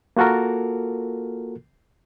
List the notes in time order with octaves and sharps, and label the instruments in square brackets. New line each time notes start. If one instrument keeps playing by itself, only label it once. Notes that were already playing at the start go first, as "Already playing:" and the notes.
[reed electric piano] A#3 F4 F#4 A4 A#4